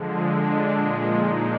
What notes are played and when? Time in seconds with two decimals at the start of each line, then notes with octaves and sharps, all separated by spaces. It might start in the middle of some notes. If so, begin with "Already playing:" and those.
Already playing: D3 F3 G#3
0.23 D3 G#3 D4
0.72 A#2 F3 G#3
1.19 A#2 G#3 D#4